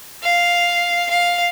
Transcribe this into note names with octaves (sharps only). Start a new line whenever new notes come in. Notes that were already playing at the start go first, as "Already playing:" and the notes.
F5
F5